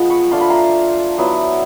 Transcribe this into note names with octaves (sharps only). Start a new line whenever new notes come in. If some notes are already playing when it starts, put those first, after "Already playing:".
Already playing: F3 G#3 B3
B5 C#6
A3 D4 F4 C6
B5
A#5 C6
F#3 B3 E4